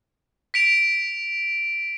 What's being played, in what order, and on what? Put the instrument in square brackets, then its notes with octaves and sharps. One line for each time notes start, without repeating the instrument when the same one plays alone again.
[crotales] B6 D7 F7